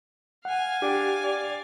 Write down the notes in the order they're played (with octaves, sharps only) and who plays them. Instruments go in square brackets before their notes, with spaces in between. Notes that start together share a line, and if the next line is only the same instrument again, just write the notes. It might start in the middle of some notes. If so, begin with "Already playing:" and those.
[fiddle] F5 G#5 [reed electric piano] F#5
[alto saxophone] D4 [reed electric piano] G4
[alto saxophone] D5